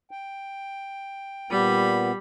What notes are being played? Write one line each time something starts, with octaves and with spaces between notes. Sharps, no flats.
G5
A#2 G3 B3 B5